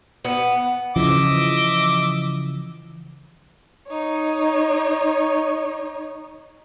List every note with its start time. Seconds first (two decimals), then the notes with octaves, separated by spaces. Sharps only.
0.25 B3
0.96 C#3 E3 F3 D#5 E5 D6
3.87 D#4 C#5